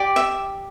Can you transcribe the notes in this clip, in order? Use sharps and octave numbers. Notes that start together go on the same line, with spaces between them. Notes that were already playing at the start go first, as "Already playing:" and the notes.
Already playing: G4 D5
E5